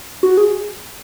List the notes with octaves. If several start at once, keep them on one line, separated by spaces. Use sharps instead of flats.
F#4
G#4